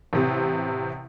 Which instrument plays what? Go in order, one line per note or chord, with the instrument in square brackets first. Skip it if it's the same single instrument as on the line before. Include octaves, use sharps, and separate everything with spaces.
[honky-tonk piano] A1 C3